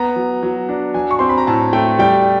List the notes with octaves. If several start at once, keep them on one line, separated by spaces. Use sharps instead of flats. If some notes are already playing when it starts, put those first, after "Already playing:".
Already playing: B3 A#5
F#3
F#3
D4
F#3 G#5
C#6
C4 C6
B5
A#5
A2 A5
A3 G5
G3 G5